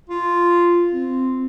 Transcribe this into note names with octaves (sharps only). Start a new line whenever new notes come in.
F4
C4